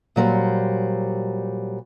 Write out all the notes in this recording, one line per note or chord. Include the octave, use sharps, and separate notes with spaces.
A#2 F#3 G3 C5